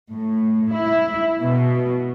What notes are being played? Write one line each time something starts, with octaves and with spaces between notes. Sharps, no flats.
A2
E4
B2